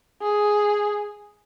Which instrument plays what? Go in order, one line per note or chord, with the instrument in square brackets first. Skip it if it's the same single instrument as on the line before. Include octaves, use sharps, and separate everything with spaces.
[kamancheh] G#4